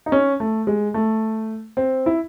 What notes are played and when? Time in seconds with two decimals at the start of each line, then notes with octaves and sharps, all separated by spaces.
0.06 D#4
0.12 C#4
0.40 A3
0.67 G#3
0.94 A3
1.77 C4
2.06 E4